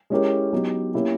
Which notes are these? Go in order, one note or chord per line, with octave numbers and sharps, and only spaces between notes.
G#3 C#4 E4 G4 A#4
F#3 B3 D#4 G4
A#3 C#4 E4 G4